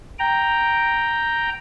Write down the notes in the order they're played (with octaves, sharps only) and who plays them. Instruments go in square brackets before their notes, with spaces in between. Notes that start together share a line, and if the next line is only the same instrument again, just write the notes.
[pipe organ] G5 A#5